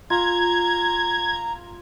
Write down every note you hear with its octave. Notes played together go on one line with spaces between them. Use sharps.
F4 A#5 G#6